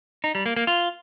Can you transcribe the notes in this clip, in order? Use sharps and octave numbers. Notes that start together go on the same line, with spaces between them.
D#4
G3
A#3
A#3
F4